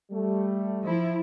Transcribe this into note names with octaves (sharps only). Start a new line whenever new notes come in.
G3 A3
F3 E4